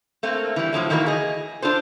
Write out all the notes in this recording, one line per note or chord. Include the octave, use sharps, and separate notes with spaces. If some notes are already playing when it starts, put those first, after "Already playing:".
A3 A#3 C4
E3 G3
A2 F3 F#3 A3
D#3 E3 A#3 F#4
G#4 D#5
D4 F4 A4 C5